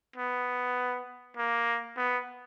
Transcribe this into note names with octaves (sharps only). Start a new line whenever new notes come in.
B3
A#3
B3